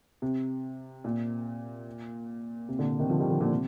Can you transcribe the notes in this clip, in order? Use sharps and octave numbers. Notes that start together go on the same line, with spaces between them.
C3
A#2
C3
A#2 D3
C3 D#3
D3 F3
D#3 G3
D3 F3
A#2 D3
C3